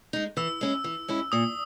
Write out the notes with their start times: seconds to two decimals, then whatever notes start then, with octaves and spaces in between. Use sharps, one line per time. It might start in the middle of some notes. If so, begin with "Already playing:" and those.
0.13 G#3 D#4
0.37 E3 E6
0.61 G#3 C#4 E4
0.84 E3
1.08 G#3 C#4 E4
1.32 A#2 D#6